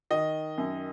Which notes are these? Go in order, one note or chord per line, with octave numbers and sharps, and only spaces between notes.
D#3 D#5
F#2